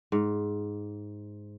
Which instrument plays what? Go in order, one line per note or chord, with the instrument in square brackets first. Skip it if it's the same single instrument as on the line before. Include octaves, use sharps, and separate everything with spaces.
[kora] G#2